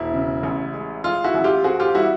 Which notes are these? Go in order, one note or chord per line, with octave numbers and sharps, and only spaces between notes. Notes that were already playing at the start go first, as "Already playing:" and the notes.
Already playing: E1 E4
C#3
A1
G#3
G#3 F4
E4 F#4
A1
F4 G4
C4 F#4 G#4
F4 G4
G3 E4 F#4